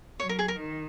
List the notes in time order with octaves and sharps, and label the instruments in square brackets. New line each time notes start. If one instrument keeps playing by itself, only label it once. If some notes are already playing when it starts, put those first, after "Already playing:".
[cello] F#3 [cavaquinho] C#5
[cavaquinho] A#4
G#4
A#4
[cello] D#3